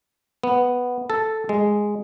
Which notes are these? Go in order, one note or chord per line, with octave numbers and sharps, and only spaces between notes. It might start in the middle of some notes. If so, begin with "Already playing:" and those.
B3
A4
G#3